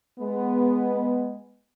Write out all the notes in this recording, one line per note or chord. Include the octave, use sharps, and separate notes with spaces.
G#3 B3